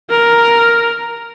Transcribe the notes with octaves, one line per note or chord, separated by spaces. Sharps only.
A#4